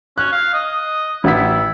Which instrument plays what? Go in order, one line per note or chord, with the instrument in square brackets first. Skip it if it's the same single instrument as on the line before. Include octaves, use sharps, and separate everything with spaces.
[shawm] C#4 [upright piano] F#6
[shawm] F5
D#5
[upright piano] A1 F#5 B6 [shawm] E4